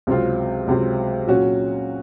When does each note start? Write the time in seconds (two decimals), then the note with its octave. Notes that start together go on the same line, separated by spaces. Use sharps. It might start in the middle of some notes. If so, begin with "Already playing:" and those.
0.07 C#2 C3 F#3 C4 F4
0.67 C#2 C3 F#3 C4 F4
1.27 A#2 F#3 C#4 F#4